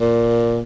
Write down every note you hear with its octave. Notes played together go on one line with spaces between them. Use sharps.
A#2